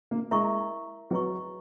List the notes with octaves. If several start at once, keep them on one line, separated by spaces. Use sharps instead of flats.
A#3
G#3 E4 A#4 E5 A#5 C#6
F#3 G#4 B4 D#5 A#5 C#6